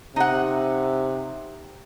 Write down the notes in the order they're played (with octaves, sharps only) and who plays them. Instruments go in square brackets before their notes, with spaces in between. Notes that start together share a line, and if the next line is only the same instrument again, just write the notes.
[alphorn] C3 [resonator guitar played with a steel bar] D#4 F#5